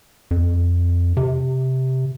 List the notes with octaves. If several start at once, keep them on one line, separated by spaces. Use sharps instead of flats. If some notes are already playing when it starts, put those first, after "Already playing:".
F2
C3